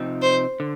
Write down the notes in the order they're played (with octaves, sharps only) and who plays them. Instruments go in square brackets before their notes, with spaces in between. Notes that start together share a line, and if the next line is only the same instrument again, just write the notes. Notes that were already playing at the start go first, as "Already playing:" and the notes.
Already playing: [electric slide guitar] C3 F3 C4 D#4
[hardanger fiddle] C5
[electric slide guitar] D3